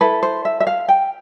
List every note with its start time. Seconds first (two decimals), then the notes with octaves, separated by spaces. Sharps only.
0.01 E4 A4 B4
0.23 C5
0.45 E5
0.60 E5
0.67 F5
0.88 G5